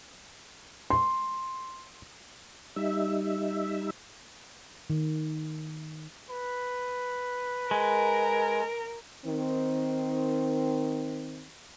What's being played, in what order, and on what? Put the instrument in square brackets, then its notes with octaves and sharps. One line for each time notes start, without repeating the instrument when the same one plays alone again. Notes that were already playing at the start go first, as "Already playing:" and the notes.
[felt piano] C6
[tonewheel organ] G3 D#4 E5
[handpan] D#3
[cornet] B4
[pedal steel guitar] G#3 [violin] A#4
[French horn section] D#3 C4